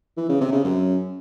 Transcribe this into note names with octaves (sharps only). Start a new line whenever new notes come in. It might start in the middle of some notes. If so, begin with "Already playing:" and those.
E3
C#3
C3
C#3
F#2